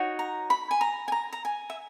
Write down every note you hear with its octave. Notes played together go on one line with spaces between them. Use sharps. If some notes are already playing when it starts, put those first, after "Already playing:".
Already playing: D#4 F#4 C#5
A#5
B5
G#5
A#5
G#5
A#5
A#5
G#5
E5